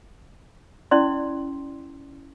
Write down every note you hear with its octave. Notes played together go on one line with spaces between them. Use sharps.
C#4 E4 D5 C6